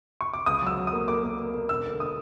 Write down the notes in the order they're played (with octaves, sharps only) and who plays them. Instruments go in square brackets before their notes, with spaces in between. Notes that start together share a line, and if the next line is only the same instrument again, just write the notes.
[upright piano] C#6
D6
C#2 D#6
F#3 E6
F#3
D#6
A#3
A#3 D6
A#3
A#3
A#3
E1 E6
D3
D#6